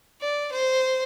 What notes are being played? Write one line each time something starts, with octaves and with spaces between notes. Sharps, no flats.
D5
C5